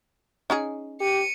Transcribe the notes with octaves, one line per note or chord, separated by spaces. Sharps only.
C#4 D#4 G#4
G4 C#7 D#7